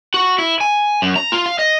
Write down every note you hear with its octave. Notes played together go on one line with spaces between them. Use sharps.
F#4
E4
G#5
F#2
A#5
F4
F5
D#5